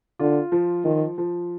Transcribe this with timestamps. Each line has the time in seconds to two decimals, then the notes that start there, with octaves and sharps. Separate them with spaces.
0.19 D3 F4
0.52 F3
0.85 D#3 F3
1.18 F3